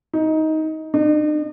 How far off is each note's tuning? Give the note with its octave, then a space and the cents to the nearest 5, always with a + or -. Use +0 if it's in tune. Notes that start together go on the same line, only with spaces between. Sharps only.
D#4 +15
D#4 -45